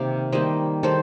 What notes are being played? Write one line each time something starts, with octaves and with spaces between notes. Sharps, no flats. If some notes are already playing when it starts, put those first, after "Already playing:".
Already playing: C3 D#3 A#3 D5 F5
D#3 G3 A#3 C5 D#5
D#3 G3 A4 C5